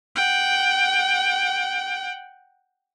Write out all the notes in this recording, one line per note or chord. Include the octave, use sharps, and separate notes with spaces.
F#5 G5